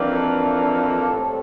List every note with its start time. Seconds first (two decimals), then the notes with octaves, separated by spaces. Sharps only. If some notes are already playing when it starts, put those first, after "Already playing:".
Already playing: F2 E3 A#3 D4
0.16 A4
1.09 A2 G3 C4